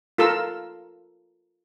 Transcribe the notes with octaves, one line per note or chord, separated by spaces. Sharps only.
F4 A4 A#4 E6